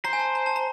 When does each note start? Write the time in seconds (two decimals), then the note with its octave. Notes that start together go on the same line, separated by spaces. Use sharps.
0.05 C5 A#5
0.13 G#5
0.20 A5
0.35 A#5
0.46 A5
0.56 A#5